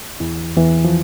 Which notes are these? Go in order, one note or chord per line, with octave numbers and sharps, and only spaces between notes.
E2 E3
E2 E3
F3